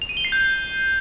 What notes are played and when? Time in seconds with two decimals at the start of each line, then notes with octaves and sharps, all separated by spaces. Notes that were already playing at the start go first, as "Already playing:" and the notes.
0.02 F7
0.09 D#7
0.17 G7
0.25 C7
0.32 G6